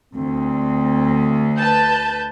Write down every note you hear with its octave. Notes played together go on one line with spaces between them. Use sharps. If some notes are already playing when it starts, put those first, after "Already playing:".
D2 C4
B4 A5 G6